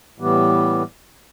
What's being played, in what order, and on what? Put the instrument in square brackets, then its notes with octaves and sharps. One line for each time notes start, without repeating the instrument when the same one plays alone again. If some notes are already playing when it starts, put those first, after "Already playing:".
[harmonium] A2 E3 G3 B3 G4